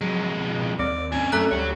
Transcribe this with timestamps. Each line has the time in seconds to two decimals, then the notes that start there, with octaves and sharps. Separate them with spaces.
0.01 F2 F#3 G#3
0.40 B2
0.79 D#2 C4 D5
1.12 C#4 D4 G#5
1.32 F#2 A3 A4 A#5 F#6
1.52 D2 G3 C#5 F#5